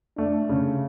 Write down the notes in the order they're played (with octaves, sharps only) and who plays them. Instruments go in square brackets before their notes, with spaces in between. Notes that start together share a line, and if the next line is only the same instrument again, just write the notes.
[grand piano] A3 [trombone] D4
[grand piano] C#3